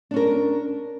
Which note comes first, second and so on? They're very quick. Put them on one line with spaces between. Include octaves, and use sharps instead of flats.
D4 C#4 A#4